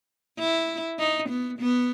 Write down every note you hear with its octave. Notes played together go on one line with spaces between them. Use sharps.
E4
D#4
B3
B3